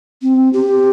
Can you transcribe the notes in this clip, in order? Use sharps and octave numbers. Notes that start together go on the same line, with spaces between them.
C4
G4